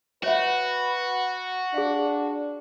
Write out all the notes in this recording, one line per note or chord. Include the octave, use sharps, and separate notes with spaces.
F#4 B4 C#5 E5 F#5
D4 G#4 F5